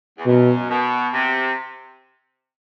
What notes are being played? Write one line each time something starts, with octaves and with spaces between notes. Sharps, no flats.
E2
F#2 B2
B2
C3